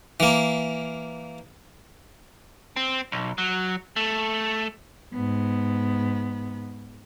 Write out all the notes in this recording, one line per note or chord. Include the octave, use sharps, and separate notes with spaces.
E3 A#3
C4
B1
F#3
A3
G#2 B3